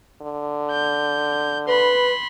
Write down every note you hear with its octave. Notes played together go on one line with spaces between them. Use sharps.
D3
G6
B4 B5 C6